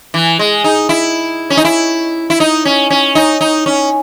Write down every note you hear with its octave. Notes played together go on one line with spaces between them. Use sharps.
E3
G#3
D#4
E4
C#4
D#4
E4
E4
D#4
C#4
C#4
D#4
D#4
C#4